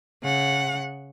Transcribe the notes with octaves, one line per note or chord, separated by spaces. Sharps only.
C#3 F#5